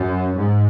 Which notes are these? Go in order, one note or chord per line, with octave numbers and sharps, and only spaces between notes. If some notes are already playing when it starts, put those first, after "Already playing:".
Already playing: F#2
G#2